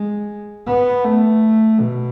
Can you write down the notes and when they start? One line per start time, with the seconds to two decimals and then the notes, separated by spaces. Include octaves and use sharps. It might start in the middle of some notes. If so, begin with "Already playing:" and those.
Already playing: G#3
0.67 B3
1.04 A3
1.80 B2